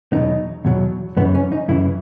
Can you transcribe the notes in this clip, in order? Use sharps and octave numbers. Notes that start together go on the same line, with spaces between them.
E2 B2 F#3 D#4
E2 B2 F#3
F#2 C#3 E3 B3
C#4
D#4
F#2 C#3 E3 E4